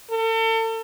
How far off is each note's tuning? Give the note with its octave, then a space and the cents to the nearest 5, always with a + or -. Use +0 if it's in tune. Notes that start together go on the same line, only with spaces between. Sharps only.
A4 +40